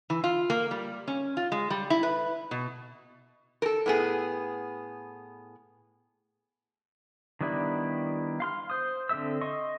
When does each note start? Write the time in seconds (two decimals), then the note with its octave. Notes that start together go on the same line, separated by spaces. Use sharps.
0.10 E3
0.24 F4
0.50 A#3
0.71 G3
1.08 C#4
1.37 F4
1.52 G#3
1.70 G3
1.90 E4
2.03 B4
2.51 B2
3.62 A4 A#4
3.86 A2 B3 G#4
7.41 D#3 G3 B3 D4 E4
8.40 F5 C6 F6
8.70 C5 D#6
9.09 D3 C4 A4 E5 E6
9.41 D#5 C6 C#6